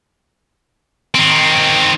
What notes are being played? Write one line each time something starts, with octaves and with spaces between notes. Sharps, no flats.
D#3 C4